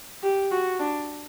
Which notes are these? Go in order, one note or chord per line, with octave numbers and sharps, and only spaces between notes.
G4
F#4
D4